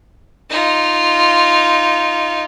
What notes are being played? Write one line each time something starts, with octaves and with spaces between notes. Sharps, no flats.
D#4 F4